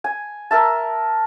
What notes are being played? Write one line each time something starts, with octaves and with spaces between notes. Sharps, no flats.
G#5
A#4 E5 A5